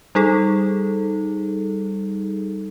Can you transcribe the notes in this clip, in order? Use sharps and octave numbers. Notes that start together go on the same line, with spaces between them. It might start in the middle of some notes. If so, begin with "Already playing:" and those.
G3 D#4 G#4 A4